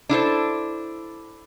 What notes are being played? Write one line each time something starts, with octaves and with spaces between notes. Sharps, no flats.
D4 E4 A4 C5